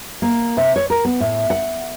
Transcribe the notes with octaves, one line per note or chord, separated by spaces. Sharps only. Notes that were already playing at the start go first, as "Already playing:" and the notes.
A#3
C3
C#5
A#4
B3
A2
F#5